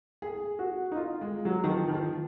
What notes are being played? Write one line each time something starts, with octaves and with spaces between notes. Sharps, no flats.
G#4
F#4
D#4
F4
G#3
F#3
D#3
F3
D#3
F3